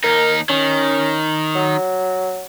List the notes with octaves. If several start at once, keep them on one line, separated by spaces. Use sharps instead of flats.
D#2 D#4 A#4
D#3 C#4
F#3